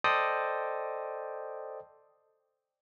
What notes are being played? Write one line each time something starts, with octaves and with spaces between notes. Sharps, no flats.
A4 C5 D5 D#5 G5 D#6